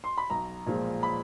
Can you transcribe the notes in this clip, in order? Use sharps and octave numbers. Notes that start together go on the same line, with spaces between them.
C6
B5
B1 A#5
A#2 F3 G#3
B5